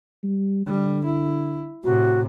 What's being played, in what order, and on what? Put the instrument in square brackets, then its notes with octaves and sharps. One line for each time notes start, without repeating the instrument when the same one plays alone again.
[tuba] G3
[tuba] D3 [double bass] G3
[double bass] E4
[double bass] A2 C3 [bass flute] F#4